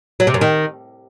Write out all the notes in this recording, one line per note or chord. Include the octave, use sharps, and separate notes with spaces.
F#3
C3
F#2
D#3